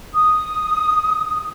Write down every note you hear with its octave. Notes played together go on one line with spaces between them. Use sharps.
D#6